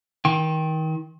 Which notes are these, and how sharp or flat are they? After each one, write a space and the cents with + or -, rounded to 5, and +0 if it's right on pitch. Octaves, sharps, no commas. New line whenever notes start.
D#3 +35 G5 +0 C6 +45